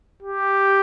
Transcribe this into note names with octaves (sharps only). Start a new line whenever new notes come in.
G4